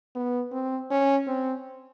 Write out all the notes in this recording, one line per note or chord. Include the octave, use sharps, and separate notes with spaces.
B3
C4
C#4
C4